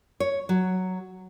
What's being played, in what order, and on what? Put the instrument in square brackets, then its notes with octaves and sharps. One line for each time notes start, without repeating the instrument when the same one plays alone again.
[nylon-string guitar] C#5
F#3